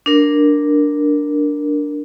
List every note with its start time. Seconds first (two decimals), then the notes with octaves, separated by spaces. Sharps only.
0.06 D4 A#4